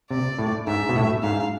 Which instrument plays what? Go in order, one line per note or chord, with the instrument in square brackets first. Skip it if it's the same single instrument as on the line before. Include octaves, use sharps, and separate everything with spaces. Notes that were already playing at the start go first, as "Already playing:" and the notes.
[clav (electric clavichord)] C3 [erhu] D5
[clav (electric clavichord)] A2
[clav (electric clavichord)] G#2 [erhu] E5
[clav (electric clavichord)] B2
A2
[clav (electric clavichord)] G#2 [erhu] F5